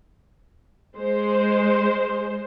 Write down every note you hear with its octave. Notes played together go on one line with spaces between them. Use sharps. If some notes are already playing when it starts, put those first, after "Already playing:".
G#3 C5